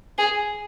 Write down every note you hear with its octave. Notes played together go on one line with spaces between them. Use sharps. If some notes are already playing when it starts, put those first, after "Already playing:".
G#4